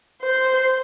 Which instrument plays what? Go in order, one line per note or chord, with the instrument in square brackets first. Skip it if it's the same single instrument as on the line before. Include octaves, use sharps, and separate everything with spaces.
[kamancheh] C5